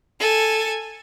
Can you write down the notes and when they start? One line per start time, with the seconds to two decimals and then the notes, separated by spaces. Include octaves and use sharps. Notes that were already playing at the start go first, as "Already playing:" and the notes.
0.20 A4 G#5